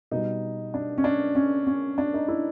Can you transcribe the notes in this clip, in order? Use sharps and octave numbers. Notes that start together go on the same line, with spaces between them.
B2 G3 D#4
D4
C#4
D4
C#4
C#4
D4
D#4
E4